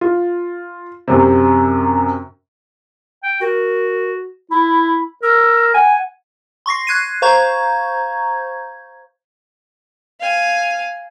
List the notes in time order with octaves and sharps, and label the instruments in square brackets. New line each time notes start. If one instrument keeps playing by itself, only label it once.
[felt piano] F4
F#2 C3
[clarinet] G5
[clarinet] F#4 [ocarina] A#4
[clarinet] E4 [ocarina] B5
[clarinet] A#4 [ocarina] E6
[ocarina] F#5 [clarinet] G#5
[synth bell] C6 C#6 A#6 C7
F#6 G#6 C7 D#7
C5 F5 A#5 C#6 G6 G#6
[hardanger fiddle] F5 G#5